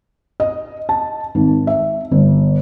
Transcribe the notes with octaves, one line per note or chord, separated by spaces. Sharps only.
D#5
A5
G#1
E5
G1